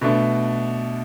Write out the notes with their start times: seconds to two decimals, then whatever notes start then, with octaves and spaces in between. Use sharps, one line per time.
0.01 B2 A3 D4